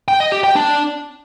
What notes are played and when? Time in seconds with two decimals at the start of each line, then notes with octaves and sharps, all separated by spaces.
0.08 G5
0.20 D#5
0.32 G4
0.44 G5
0.56 D4